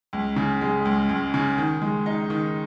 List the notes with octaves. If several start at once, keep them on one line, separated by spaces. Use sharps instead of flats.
C#2
C#3
G#3
C#2
C#2
C#3
D#3
G#3
D#4
D#3